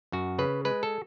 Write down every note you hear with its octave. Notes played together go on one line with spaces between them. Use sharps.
F#2 F#4
C#3 B4
G#3 B4
A4